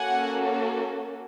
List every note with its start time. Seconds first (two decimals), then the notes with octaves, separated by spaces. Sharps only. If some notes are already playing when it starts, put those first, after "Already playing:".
Already playing: A#3 C#4 F#4 A4 F#5 G#5